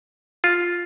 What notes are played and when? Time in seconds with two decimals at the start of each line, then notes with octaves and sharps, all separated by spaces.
0.44 F4